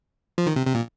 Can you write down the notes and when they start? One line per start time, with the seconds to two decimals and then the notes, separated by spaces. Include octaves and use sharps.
0.38 F3
0.46 D#3
0.56 C3
0.66 C3
0.75 A#2